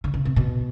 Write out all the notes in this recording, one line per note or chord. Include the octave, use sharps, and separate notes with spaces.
D3
C#3
C3
B2